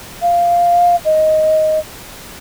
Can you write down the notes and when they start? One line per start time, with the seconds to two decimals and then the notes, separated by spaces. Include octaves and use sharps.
0.22 F5
1.05 D#5